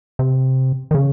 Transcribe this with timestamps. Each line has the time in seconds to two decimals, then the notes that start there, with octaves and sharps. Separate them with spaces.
0.19 C3
0.91 D#3
0.95 C#3